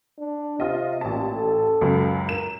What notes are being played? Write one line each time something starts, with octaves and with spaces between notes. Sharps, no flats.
D4
C3 F4 D#5
A1 A#2 A5
A4
C#2 F#2
A#4 E7